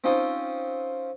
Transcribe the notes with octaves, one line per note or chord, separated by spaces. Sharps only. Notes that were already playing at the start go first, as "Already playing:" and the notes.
C4 C#4 D#4 F4